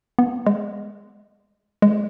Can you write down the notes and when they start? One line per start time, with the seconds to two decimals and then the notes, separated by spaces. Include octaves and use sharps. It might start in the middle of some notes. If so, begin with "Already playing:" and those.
0.19 B3
0.47 G#3
1.82 G#3